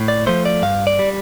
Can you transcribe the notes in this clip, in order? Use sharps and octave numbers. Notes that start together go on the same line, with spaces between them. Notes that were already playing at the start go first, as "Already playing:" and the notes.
Already playing: A2
D5
F3 A3 C5
D5
G2 F5
D5
G3